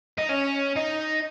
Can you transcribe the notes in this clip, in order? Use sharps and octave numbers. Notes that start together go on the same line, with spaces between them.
D#4
C#4
D#4